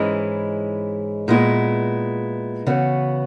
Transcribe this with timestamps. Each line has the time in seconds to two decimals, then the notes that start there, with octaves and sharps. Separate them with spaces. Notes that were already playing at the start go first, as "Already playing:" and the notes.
Already playing: G#2 E3 G#3 C#4 E4
1.28 A#2 G#3 B3 E4
2.66 C#3 E3 B3 F#4